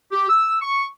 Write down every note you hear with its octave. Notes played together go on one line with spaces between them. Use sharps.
G4
E6
C#6